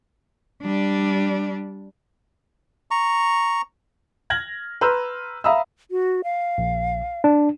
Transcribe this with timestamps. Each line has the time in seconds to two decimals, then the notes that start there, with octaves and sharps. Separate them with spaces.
0.62 G3 D4
2.91 A#5 C#6
4.30 F6 G#6 A#6 F#7
4.81 B4 A#5 C6 E6 F6 G6
5.44 E5 F5 A#5 B5 D#6 E6
5.91 F#4
6.24 F5
6.58 A#1
7.24 D4